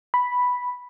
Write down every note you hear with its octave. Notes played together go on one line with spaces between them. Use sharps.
B5